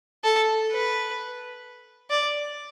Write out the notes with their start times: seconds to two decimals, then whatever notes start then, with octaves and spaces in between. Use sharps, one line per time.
0.24 A4
0.70 B4
2.10 D5